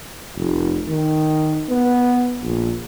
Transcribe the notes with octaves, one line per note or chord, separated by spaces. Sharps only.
F1
D#3
B3
A#1